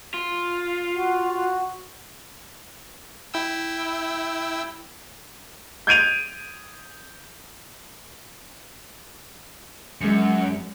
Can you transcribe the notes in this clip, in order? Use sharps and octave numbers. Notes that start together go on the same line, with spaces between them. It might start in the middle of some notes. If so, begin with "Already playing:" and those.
F4
F#4
F#4
E4 G5 E6
G6 G#6 D7 D#7 F7
F#2 G#3 C#7